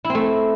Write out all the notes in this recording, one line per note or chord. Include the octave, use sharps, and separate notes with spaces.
E4
C4
A3